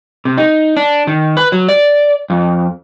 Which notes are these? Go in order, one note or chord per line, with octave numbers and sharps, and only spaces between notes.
C3
D#4
D4
D#3
B4
F#3
D5
F2